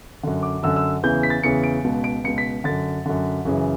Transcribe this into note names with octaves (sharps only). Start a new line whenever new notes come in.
F#2 D3
D6
F#2 D3 E6
E6
E2 C#3 E3 G6
B6
A6
E2 C#3 E3 C#7
D7
C#2 B2
D7
C#2 B2 C#7
B6
F#2 D3 A6
F#2 D3
F#2 C#3 E3